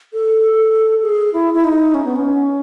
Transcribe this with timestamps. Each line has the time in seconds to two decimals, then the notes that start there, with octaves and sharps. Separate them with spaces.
0.13 A4
1.02 G#4
1.33 E4
1.54 E4
1.64 D#4
1.94 C#4
2.05 B3
2.16 C#4